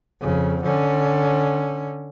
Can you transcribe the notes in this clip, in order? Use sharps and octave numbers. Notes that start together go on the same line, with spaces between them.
F2 C#3
D3 C#4